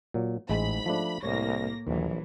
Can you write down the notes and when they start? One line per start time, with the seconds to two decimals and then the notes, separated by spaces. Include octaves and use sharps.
0.14 A#2 F#3
0.50 A1 G#2 G#3 B5
0.86 F3 A3 D4
1.23 C2 A2 A#3 C#5 A#6
1.87 A#1 D#2 E3 F#3